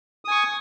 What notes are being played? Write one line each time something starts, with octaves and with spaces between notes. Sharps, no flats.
G#5 C#6 D#6